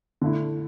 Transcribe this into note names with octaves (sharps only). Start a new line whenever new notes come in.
D3 A3 E4